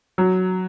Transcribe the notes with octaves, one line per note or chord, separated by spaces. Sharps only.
F#3